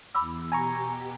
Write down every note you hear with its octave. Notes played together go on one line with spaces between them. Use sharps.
E2 B5 D6 E6
B2 G4 G#5 A#5 C#6